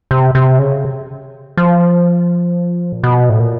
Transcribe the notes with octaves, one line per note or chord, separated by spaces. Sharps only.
C3
C3
C#3
F3
A#2
B2
A2
A#2